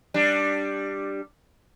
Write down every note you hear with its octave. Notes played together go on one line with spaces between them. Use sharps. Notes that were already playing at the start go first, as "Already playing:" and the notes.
G3 D4